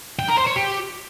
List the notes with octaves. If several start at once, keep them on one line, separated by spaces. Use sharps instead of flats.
G5
A#4
C5
C#5
G4